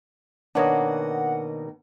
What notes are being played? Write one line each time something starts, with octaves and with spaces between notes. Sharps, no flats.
B2 D#3 A#3 D4 C#5 D#5 F#5